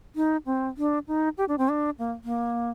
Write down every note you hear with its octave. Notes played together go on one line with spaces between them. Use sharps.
D#4
C4
D4
D#4
G4
D4
C4
D4
A#3
A#3